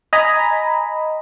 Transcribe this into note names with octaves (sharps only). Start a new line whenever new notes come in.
D#5 G#5 A#5 B5